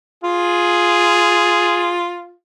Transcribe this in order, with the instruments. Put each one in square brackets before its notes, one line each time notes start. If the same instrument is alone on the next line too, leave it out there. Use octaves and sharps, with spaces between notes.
[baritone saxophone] F4 [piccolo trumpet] G#4